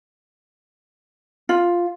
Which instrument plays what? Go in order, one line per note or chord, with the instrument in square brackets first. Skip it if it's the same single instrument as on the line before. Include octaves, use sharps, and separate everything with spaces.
[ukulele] F4